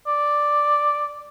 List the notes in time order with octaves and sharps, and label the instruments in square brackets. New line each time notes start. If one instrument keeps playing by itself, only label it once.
[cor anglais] D5